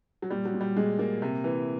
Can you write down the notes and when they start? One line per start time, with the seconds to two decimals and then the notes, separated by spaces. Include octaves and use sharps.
0.22 F#3
0.30 A#2 G3
0.45 F#3
0.54 A#2
0.61 G3
0.77 A#2 G#3
0.98 A#2 A#3
1.22 C3
1.44 E3